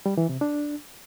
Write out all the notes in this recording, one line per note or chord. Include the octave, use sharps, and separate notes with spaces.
G3
E3
C3
D4